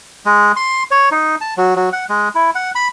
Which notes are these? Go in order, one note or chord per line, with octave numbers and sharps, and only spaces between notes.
G#3
C6
C#5
D#4
A5
F#3
F#3
F#5
G#3
E4
F#5
B5